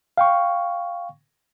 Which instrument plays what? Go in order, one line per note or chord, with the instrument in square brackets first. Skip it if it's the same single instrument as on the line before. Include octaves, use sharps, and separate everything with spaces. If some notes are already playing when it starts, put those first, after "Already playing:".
[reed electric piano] F5 G5 C#6